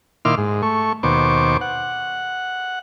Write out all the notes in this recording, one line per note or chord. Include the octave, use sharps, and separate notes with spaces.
A#2 D#3 E4 C6 D6 F6
G#2
A3 C#6
D#2 B2 C5 C#6 D6
F#5